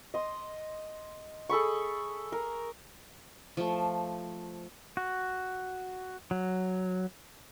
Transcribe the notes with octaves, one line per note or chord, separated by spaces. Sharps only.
D#5 C6
G#4 A4 B5 C#6
A#4
F3 A3
F#4
F#3